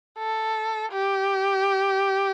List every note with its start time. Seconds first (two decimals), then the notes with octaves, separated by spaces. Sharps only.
0.18 A4
0.93 G4